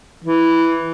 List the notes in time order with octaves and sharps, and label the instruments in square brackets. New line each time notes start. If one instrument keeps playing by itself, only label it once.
[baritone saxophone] E3